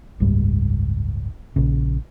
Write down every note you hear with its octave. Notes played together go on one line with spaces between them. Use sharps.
F#1 C#2 G#2 G3
A#1 C#3